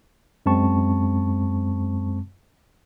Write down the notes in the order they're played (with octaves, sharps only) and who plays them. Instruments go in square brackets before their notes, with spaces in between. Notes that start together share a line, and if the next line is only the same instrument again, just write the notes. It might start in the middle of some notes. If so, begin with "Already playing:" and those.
[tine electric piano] F#2 G#3 C4 A5 C#6